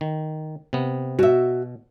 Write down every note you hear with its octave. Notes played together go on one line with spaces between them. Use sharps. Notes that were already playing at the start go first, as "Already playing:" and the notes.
D#3
C3 B3
B2 F#4 E5